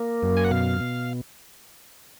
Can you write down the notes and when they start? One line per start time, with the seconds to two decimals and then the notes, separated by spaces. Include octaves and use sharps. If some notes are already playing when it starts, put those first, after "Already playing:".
Already playing: A#3
0.23 F#2
0.37 G#5
0.45 F#5
0.51 B2 F5
0.81 B2